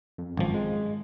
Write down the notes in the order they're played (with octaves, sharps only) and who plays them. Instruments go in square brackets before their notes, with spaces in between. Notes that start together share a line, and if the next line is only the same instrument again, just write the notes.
[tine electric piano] F2
[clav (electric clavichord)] G#1 F3 [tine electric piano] F#2
[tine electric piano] G#3